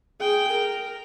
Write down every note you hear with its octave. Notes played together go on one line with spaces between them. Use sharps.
G#4 G5
A#4